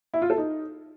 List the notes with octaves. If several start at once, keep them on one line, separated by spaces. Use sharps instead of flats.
E4
F4
A4
D#4